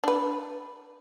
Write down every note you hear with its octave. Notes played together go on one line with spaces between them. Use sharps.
D4 B4